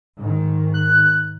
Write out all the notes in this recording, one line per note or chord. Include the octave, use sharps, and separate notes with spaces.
G#2 D#3
F#6